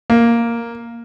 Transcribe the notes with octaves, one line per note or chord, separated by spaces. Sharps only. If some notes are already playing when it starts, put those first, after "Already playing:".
A#3